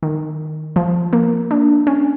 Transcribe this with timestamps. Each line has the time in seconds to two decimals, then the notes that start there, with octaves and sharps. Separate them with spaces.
0.03 D#3
0.76 F3
1.13 A#3
1.51 D4
1.87 C#4